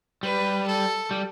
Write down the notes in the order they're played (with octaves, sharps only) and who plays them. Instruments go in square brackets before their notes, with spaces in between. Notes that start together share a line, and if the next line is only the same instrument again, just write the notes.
[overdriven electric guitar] G3 [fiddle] B4
[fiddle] A4
[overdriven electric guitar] G3